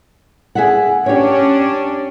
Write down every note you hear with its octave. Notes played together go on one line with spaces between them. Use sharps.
G#4 E5 F#5
C#4 D4 G4 C#5